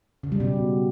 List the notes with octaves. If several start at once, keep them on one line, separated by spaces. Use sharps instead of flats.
C#3
G3
B2